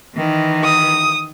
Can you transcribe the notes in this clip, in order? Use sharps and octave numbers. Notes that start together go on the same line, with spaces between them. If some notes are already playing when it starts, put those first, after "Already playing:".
D#3 E3
D#6